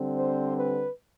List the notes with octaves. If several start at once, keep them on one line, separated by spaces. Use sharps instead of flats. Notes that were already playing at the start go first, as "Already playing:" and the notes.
Already playing: D3 G3 C4
C5
B4